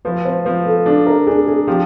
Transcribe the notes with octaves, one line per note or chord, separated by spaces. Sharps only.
F3 B4
C5
F3 B4
A4
D4 A4
A#4
D4 G#4
G#4
F3 G4